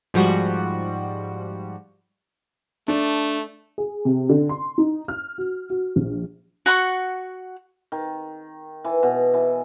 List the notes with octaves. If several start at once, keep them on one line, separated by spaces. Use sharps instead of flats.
G#2 F3 G3 F#4
A3 D4
G#4
C3
D3
C6
D#4
F6
F#4
F#4
A#1
F#4 F#5 B5 C#6
D#3
E3
B2
E3